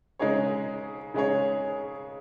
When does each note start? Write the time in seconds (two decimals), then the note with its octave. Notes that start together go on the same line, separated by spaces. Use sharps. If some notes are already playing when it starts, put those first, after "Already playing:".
0.19 C#3 G#3 D#4 G#4 C#5
1.14 C#3 G#3 D#4 G#4 C#5